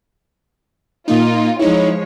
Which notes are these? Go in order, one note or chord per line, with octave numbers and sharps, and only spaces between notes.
A#2 A#3 D#4 F4
F3 G#3 D#4 E4 C#5